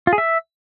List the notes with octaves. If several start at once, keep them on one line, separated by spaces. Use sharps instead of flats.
F4
G#4
E5